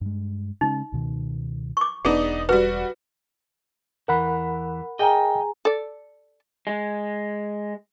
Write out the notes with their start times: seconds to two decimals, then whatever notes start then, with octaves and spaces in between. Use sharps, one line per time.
0.01 G2 G#3
0.61 C#3 G#3 C#4 D#4
0.92 C#2 B2 D#3
1.77 C#6 D6
2.05 E1 B3 D4 D#4 G#4
2.49 G3 F#4 B4
4.08 E2 E3 A#4 F#5 B5
4.99 G#4 D#5 G5 G#5 A#5
5.65 A4 D5
6.67 G#3